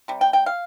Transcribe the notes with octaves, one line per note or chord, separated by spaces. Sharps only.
C3 G3
G5
G5
F5